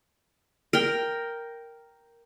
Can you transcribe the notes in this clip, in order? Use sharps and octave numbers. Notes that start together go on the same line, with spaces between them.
A#4 G5